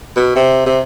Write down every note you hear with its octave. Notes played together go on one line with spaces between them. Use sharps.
B2
C3
C3